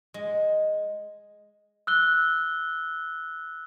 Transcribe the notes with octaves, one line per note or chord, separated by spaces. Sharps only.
G#3
E6 F#6 G7